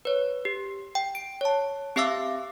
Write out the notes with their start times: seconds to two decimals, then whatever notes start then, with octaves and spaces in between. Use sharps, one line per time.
0.05 B4 C#5
0.45 G4
0.95 G5
1.15 D7
1.41 C#5 A5
1.96 C4 G4 E5 F5 D6 E6